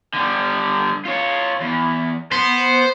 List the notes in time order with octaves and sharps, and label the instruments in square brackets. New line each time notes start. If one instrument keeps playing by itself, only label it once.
[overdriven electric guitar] D3 G3
F4 C#5
E2
[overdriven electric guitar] B3 [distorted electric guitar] C5